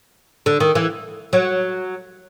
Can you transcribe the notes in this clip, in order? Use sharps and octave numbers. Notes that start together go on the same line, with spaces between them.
D3
D#3
E3
F#3